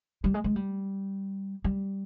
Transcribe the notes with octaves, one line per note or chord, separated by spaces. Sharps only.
G3
G#3
G#3
G3
G3